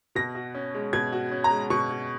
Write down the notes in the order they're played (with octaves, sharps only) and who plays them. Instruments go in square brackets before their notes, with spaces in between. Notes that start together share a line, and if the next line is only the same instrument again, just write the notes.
[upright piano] B2 [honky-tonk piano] A#6
[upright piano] F#4
C#4
G#3
[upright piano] B2 [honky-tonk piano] G#6
[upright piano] F#4
C#4
[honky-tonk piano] A#5
[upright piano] G#3
[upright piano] B2 [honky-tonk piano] C#6
[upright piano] F#4